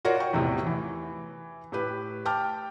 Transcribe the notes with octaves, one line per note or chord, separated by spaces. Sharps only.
F4 F#4 A#4 C#5 D5
G5 C#6
E2 A2 C3
E3
A2 G4 B4
G5 A5 D6 F6